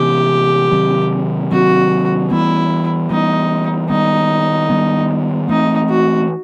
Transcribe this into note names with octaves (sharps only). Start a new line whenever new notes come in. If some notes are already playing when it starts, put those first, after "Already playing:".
Already playing: C3 E3 B3 G4
C3 D#3 F#3 C4
C3 D#3 F#3 C4 F#4
E3 G3 B3 E4
E3 G3 B3 D#4
D#3 G3 B3 D#4
D#3 G3 B3
E3 A3 C4 D#4
F#4